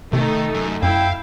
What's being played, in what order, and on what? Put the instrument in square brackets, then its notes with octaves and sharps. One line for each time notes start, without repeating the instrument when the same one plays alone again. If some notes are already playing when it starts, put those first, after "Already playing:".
[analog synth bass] C3 [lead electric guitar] D#3 [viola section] A3 D#4
[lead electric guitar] F#2
[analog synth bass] F#2 [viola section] E4 [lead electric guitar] F5 [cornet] G5